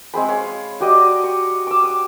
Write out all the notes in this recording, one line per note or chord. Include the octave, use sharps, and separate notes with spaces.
G#3 C4 G#4 B5
C#5 F5
F#4 G4 D5 D#5
C#6
D6 E6
D#6